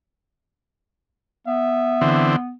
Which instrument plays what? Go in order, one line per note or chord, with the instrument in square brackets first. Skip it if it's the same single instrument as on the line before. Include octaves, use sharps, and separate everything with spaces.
[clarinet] B3 [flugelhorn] E5
[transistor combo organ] D3 E3 C4